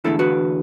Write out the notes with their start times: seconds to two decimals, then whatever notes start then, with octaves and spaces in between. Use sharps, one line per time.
0.04 E2 D3 A3 E4 A4
0.19 F#4 B4